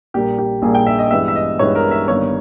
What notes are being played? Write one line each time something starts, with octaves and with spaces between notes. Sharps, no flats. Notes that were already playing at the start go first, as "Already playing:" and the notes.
A#1 A#2 G3 A#3 G4
G4
A#1 A#2 G3 A#3 G#4
G5
E5
D#5
G2 E3 G#3 B3 E5
E5
D#5
G2 E3 G#3 B3 C#5
A#4
E5
G1 G2 D#3 A#3 C#5